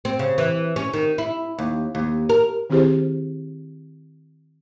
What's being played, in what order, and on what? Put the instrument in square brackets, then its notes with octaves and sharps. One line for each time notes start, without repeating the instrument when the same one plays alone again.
[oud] C4
C#3
E3
C#4
D#3
E4
D#2
D#2
A#4
[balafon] D#3 C4 E4 G4 G#4 C5